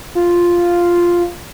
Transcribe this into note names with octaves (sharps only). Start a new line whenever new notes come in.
F4